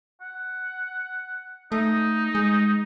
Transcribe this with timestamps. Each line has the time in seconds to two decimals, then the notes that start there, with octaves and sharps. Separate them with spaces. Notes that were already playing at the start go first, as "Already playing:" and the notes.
0.21 F#5
1.72 A3 D#4
2.35 G#3